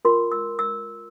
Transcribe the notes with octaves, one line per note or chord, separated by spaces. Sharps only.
F4 A#4 C6
E6
E6